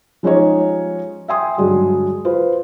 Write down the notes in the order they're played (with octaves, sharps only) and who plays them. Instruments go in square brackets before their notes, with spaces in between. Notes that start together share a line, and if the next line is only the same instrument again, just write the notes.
[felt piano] F3 G#3 C#4 D#4 G4 C#5
E5 G5 G#5 C6 D#6
G2 D3 F#3 G#3
F4 B4 C5